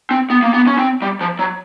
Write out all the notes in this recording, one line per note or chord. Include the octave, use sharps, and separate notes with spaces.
C4
B3
A#3
B3
C#4
C4
G3
F3
F#3